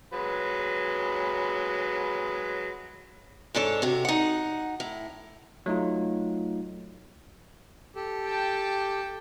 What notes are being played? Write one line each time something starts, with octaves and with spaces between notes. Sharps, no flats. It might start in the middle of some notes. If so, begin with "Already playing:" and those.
F#3 G#3 B4
G#2 D4 A4 C#5
C3 F#4
D#4 F#5
A2
F#3 A3 D#4 F4
G4 A4
G5 A5